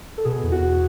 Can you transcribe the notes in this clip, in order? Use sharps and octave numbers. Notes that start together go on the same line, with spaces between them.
A4
B2 G#4
E2
F#4
E2